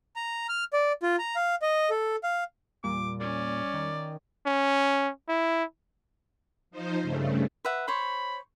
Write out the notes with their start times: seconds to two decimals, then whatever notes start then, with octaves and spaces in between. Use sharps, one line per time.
0.16 A#5
0.49 F6
0.73 D5
1.03 F4
1.19 A#5
1.36 F5
1.62 D#5
1.90 A4
2.24 F5
2.84 E2 A#2 G3 D6
3.20 C#4 D5
3.74 D#3
4.46 C#4
5.28 E4
6.71 F3 D#4 C5
7.01 G2 C#3 A3
7.65 B4 E5 F#5
7.88 C5 C#5 B5